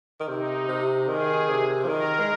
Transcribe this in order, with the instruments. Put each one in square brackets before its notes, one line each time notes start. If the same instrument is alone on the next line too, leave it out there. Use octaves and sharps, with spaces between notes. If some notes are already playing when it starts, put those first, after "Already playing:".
[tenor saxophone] D#3
[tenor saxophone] C3 [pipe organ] D#4
[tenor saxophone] C3
[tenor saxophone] D#3 [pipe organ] G#4
[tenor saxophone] C3
F3
[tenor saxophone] D#3 [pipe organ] A#4
[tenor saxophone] G#3